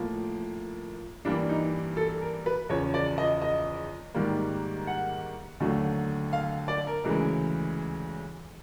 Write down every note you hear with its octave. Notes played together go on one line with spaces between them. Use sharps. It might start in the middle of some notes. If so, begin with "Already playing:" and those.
Already playing: A2 F3 A#3
G2 E3 G3 A#3 D4
D#4
A4
A#4
B4
E2 C#3 F3 C#5
D5
D#5
D#5
G#2 D#3 G3 A#3
F#5
D#2 D3 F#3 A3
F5
D5
A#4
D2 C#3 E3 G#3